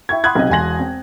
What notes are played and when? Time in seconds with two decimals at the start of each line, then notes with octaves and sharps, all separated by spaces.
0.09 E4 G5 C#6 G#6
0.24 F#5 B5 C6 D#6 F#6 G#6
0.35 B1 C3 C4 D#5
0.50 E1 E2 G#5 C6 A#6 F#7
0.80 C4